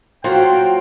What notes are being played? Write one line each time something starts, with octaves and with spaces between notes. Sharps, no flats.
F#3 A#3 F4 C5 G5